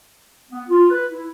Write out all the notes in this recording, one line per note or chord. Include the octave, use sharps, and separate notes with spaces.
B3
F4
B4
E4